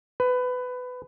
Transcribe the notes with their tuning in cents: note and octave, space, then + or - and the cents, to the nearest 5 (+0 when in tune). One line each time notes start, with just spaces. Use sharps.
B4 +20